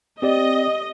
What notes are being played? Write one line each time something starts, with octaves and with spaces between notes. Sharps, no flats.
C4 G4 D5 D#5